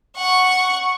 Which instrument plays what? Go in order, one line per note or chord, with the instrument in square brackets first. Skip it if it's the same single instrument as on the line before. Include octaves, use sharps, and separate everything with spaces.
[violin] F#5 C#6